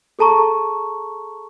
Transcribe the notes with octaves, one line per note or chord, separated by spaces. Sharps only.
G#4 A4 A5 A#5 C#6